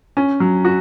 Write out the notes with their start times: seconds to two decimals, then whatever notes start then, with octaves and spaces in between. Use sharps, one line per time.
0.17 C#4
0.40 F#3
0.65 F#4